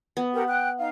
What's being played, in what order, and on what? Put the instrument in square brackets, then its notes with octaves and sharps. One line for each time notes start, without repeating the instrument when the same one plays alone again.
[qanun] B3
[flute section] G4 A#4 F#5
G5 F#6
D#4 F5